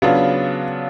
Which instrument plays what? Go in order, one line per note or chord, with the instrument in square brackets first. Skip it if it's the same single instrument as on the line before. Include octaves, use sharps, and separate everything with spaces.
[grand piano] C#3 F#3 B3 D4 F4